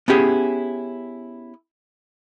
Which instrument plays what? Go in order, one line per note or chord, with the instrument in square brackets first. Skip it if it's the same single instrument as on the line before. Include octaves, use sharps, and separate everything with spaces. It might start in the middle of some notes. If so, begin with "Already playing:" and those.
[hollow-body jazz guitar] B3 C#4 E4 G4 G#4